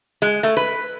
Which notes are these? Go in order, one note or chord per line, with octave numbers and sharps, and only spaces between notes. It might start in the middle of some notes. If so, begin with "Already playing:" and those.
G#3
A3
B4